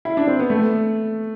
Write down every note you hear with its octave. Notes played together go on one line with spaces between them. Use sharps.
E4
D4
C4
B3
A3